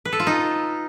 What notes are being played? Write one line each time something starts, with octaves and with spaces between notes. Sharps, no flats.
B4
A4
F4
D#4